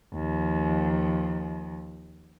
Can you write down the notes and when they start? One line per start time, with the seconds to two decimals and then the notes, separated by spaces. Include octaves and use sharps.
0.14 D#2 F3